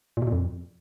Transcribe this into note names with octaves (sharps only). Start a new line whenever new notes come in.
A#2
B2
A#2
F2